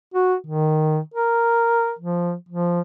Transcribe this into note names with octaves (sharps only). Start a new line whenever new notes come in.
F#4
D#3
A#4
F3
F3